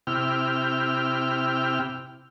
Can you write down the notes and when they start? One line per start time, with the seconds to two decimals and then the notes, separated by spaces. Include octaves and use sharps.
0.07 C3 E4 G5 F6